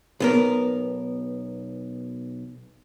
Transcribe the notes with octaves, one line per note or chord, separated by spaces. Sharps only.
B1 B3 A#4